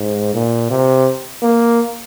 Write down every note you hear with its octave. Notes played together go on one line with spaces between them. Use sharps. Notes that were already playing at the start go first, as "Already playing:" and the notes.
Already playing: G#2
A#2
C3
A#3